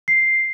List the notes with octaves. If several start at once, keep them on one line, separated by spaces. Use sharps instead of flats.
C7